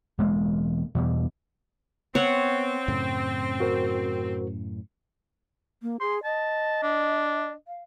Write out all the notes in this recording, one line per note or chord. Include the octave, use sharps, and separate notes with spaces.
E1 G#3 A#3
E2 B2 G3
B3 C4 C#5 F#5
F#2 A2 C#3
F#4 A#4 C5
A#3
G#4 C6
D#5 A5
D4
F5